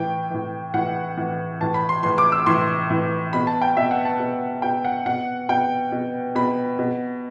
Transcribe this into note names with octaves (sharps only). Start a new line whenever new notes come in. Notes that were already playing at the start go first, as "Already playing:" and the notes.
Already playing: A2 E3 G5
A2 E3
A2 E3 F#5
A2 E3
A2 E3 A5
B5
C6
A2 E3 C6
D6
E6
A2 E3 C6
A2 E3
B2 B5
A5
G5
B2 E5
F#5
A5
B2
B2 G5
F#5
B2 F#5
B2 G5
B2
B2 B5
B2